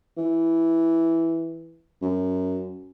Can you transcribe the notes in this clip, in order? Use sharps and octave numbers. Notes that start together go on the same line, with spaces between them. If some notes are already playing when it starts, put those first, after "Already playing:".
E3
F#2